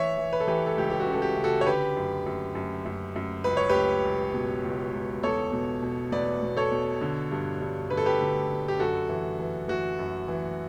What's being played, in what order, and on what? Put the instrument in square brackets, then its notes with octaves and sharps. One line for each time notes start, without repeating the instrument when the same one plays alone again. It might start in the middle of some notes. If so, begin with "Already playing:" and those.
Already playing: [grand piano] E3 C#5 E5
E3
B4
A4
E3 G4 B4
A4
C#2 G4
G4
F#4
C#3
A4
G4
C#3
F#4 A4
C#5
D3 G4 B4
F#2
F#2
F#2
F#2
F#2
C#2 B4
C#5
C#2 G4 B4
C#2
B2
C#2
C#2
E2 A4 C#5
B2
B2
E2 B4 D5
B2
A4 C#5
B2
D3
G2
G2
D3 B4
A4
G4 B4
D3
D3
G4
F#2 F#4 A4
E3
E3
E3 F#4
F#2
E3